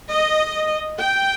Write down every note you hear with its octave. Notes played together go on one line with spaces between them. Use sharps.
D#5
G5